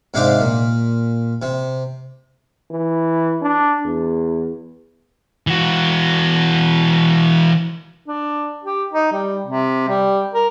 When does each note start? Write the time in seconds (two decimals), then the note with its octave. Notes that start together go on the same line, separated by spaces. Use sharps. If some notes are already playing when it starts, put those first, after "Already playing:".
0.14 G#2 C3 D4 G4 F5 D6
0.41 A#2
1.42 C3
2.71 E3
3.42 D4
3.85 E2
5.47 E3 F#4
8.07 D4
8.64 G4
8.92 D#4
9.12 G3
9.46 C3
9.88 G3
10.33 A#4